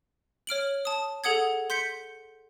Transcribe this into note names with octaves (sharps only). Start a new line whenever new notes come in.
C#5 F6 D7 F#7
A5 D#6
G#4 A4 F#5 D#6 G#6
C6 G6 B6 C#7